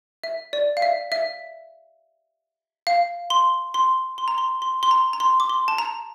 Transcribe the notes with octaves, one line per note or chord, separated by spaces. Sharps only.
E5
D5
F5
E5
E5
F5
C6
C6
C6
A#5
C6
C6
C6
A#5
A#5
C6
D6
C6
A5
A#5